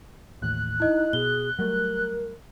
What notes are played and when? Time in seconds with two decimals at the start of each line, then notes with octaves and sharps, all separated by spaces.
0.42 A1 D#2 A2 F#6
0.80 D#4 E4 D#5
1.13 B2 G#4 G7
1.59 F#3 G3 A3 A#4